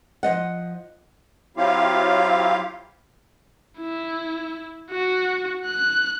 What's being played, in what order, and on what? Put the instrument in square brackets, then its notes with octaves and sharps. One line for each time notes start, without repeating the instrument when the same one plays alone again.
[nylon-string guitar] F3 D#5 F#5
[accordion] F#3 C4 E4 F4 G4 F5
[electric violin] E4
F#4
F#6